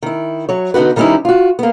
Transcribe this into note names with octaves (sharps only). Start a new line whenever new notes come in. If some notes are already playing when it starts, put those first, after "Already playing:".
D#3 E4
F#3 C#5
D3 B3 D#4 F#4 B4
D#3 G3 B3 C#4 D#4 E4
F4 F#4
A#3 B3